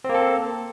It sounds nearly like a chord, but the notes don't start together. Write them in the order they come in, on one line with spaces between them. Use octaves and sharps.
C4 A#3 A4